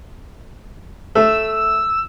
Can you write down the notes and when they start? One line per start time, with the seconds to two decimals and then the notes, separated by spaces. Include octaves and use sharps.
1.15 A3 E6